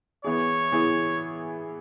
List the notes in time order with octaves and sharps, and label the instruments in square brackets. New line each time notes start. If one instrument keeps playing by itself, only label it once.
[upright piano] E3 B3 E4 G#4 [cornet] C#5
[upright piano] E3 B3 E4 G#4